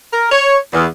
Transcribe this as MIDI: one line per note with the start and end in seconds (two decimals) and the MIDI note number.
0.13 0.31 70
0.32 0.57 73
0.73 0.86 40